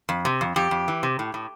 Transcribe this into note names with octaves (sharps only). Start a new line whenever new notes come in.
F2
C3
F2
F2 G4
F2
E3
C3
A2
A2